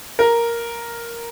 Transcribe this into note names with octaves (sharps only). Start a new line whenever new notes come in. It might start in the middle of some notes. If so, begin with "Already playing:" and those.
A#4